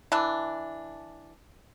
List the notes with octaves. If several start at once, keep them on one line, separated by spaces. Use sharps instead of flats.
E3 D4